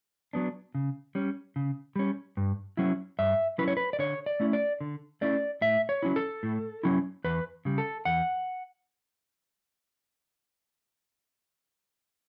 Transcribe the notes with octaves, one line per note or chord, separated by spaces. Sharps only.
F#3 B3 D4
C#3
G3 C#4
C#3
G3 C#4
G2
F#3 C#4 E4
G2 E5
F#3 C#4 E4 B4
C#5
B4
D5
D3 C#5
D5
A3 C#4 E4
D5
D3
A3 C#4 E4 D5
A2 E5
C#5
F#3 C#4 E4
A4
A2
F#3 C#4 E4
E2 B4
C#3 G3
A4
E2 F#5